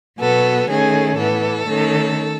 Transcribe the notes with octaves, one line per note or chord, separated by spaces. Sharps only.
B2 F#3 B3 A4
D#3 A3 C#4 G#4
A2 E3 B3 A4
D#3 A3 C#4